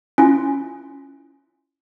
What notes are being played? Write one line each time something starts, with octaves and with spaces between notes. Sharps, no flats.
C#4 E4 F4